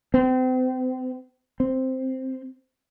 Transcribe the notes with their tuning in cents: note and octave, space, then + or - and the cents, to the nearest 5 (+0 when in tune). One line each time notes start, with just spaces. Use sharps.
C4 -35
C4 +0